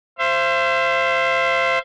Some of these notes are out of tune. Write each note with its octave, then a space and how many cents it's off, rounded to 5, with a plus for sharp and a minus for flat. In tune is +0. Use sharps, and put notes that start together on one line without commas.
C5 +5 E5 +45